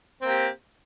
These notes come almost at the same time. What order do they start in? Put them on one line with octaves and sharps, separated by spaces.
C4 A#3 G4